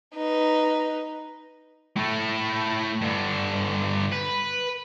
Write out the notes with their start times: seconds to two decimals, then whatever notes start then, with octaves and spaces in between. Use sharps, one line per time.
0.15 D#4 B4
1.97 A2 A3
3.02 G2 D3
4.12 B4